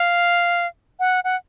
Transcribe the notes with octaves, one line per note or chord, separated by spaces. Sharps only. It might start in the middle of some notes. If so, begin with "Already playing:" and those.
Already playing: F5
F#5
F#5